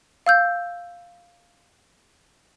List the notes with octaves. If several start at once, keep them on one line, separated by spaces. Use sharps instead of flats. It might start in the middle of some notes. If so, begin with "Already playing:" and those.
F5 E6 G6